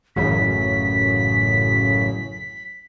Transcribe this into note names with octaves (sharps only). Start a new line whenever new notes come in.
A1 F#2 C#3 B6